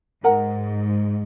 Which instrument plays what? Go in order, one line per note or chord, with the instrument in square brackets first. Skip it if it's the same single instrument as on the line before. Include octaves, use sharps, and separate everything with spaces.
[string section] G#2 [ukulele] A#4 F#5 A#5